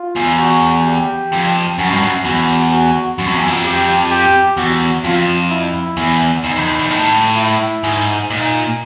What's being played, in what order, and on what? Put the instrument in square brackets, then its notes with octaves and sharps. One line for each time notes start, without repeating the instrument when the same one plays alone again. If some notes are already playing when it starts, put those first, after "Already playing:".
Already playing: [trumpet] F4
[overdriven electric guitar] E2
[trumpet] F#4
G4
[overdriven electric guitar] F2
[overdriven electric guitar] F#2 [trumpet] F#4
[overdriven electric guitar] G2
F#2
[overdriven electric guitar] E2 [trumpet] F#4
[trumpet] F#4
[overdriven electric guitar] F#2 [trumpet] F#4
[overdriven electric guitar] F2
E2
F2
[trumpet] G4
G4
[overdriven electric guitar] E2 [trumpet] F#4
[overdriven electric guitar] F2 [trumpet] F4
[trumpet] E4
[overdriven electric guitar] E2
[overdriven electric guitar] E2 [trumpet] D#4
[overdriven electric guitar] F2
E2
E2
A2
[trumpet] E4
[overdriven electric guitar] G#2
[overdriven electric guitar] A#2 [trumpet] D#4